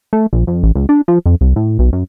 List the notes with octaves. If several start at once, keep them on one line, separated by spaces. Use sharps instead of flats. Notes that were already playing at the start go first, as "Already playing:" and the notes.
A3
A#1
F2
A1
C#2
D4
F3
F2
C2
A2
B1
F#2